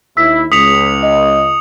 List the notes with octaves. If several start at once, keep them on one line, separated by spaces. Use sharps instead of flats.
D#2 E4 E6 B6
C#2 D#6 B6 C#7 F7
D#5